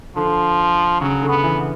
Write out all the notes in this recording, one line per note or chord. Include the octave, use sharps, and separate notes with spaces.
D3 F3
C#3 F#3
D3
B3
E3